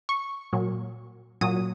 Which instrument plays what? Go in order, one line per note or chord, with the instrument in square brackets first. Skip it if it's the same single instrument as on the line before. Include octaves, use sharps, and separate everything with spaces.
[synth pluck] C#6
A#2 F#3
A#2 F#3 D#6